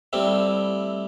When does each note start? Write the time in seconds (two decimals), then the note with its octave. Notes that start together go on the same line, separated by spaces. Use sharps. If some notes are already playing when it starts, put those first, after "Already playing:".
0.13 G3 A3 C4 E4